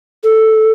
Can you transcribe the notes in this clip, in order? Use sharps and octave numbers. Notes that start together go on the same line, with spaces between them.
A4